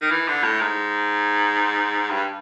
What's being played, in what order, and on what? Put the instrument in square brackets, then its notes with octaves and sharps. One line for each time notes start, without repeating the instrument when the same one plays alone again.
[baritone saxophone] D#3
E3
D3
A2
G#2
G2